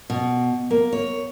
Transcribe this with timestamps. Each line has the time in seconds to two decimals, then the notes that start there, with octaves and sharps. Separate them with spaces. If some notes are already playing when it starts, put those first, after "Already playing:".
0.10 B2
0.71 A#3
0.93 C#5